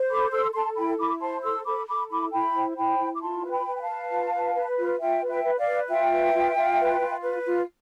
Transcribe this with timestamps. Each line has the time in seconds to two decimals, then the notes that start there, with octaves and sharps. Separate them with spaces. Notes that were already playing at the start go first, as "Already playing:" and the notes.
Already playing: C5
0.10 A4 B5 D6
0.32 A4 C6 E6
0.54 A4 A5 C6
0.77 E4 G5 B5
0.98 E4 B5 D6
1.20 C5 A5 C6
1.43 A4 C6 E6
1.65 A4 B5 D6
1.87 A4 B5 D6
2.10 E4 B5 D6
2.33 E4 G5 B5
2.54 C5
2.76 E4 G5 B5
2.99 E4
3.14 D6
3.21 F4 A5 C6
3.44 B4
3.51 G5 B5
3.66 B4
3.76 G5
3.81 F5 A5
3.89 B4
4.11 F4
4.34 B4
4.55 B4
4.78 F4
5.00 F4 E5 G5
5.22 B4
5.29 E5 G5
5.44 B4
5.59 D5 F5
5.67 B4
5.88 F4 E5 G5
6.12 B4
6.34 F4
6.56 F4
6.78 B4
7.00 F4
7.23 B4
7.45 F4